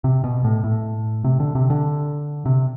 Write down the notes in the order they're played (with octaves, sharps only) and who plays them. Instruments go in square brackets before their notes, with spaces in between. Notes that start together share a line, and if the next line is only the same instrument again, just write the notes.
[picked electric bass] C3
B2
A2
A2
C3
D3
C3
D3
C3